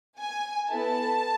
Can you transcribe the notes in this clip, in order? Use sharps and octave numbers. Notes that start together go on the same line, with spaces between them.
G#5
B3 E4 A4 A5